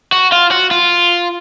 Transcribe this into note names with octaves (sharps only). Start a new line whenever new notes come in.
F#4
F4
F#4
F4